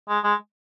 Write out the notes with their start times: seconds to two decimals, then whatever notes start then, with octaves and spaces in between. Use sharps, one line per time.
0.09 G#3
0.24 G#3